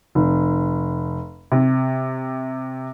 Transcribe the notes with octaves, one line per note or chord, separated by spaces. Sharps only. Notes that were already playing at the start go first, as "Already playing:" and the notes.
F1
C3